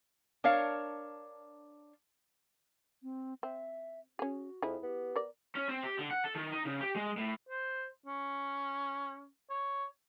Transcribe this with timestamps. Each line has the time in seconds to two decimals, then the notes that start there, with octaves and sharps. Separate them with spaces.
0.44 D4 A#4 C#5 F5
3.03 C4
3.43 C4 E5
4.19 C#4 F#4 G#4
4.62 F2 E4 G#4
4.83 B3 G4
5.16 A#4 D5
5.55 C#4
5.69 C4
5.83 G4
5.99 D3
6.11 F#5
6.24 A4
6.35 D#3
6.52 D#4
6.65 C#3
6.81 G4
6.96 G#3
7.17 A2
7.49 C5
8.06 C#4
9.50 C#5